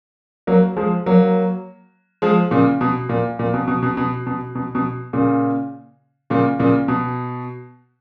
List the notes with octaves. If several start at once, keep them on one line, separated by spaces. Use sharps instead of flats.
F#3 A#3
F3 G#3
F#3 A#3
F3 G#3
A#2 C#3
B2
A#2
A#2
B2
B2
B2
B2
B2
B2
B2
A#2 C#3
A#2 C#3
A#2 C#3
B2